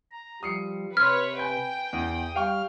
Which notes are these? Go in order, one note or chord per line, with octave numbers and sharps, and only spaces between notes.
A#5
F3 G3 D#6 C7 C#7
C3 B4 C#5 C6 F6 G#6
B4 G5 G#5 G6
E2 D#6
G3 F5 G5 C#6 F6